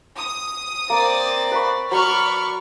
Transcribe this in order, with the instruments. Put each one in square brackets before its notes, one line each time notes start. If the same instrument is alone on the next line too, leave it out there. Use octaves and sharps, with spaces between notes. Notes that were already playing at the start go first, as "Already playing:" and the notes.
[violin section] D#6
[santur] A#3 [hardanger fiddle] C4 D5
[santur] B4 B5 C#6
[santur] F#3 B4 [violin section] D5 C#6 F6 [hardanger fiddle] B5